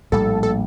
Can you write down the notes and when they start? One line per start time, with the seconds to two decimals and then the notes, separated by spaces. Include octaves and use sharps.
0.12 A#1 A2 G3 A#3 A4
0.43 A4